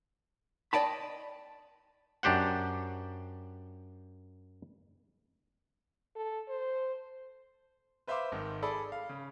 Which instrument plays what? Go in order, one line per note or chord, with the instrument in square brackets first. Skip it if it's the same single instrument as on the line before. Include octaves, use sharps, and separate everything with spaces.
[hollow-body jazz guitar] D5 D#5 G5 A5 B5
[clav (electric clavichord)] F#2 D4 G4 C5 F#5
[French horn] A4
C5
[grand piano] B4 C5 E5 F5 C6 D6
G#1 D#3
G#4 A4 D5 B5
F5
C#3